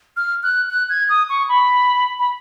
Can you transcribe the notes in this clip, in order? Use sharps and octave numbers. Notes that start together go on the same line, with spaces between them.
F6
F#6
F#6
G#6
D#6
C#6
B5
B5